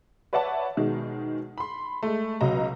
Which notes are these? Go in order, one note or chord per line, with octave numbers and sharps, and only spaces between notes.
B4 C#5 D5 E5 F#5 A5
B2 D#3 G#3
B5 C6
G#3 A3
C#2 B2 F#3 D#5 A#5